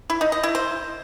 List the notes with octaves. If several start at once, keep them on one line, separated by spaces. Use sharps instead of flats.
E4
D#4
D#5
E4
C5